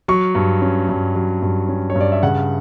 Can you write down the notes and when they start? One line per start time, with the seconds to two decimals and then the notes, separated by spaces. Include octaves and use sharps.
0.08 F#3 C#6
0.35 G2
0.62 C#4
0.89 G2
1.16 F#3
1.42 G2
1.69 C#4
1.90 C#5
1.96 G2
2.01 D5
2.12 E5
2.23 C#3 F#5